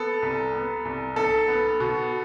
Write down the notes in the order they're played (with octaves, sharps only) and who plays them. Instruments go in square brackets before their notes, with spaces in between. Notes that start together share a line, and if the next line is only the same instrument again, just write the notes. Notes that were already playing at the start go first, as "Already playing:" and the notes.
Already playing: [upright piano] B3 A4
C2
B3
C2
B1 A4
B3
B2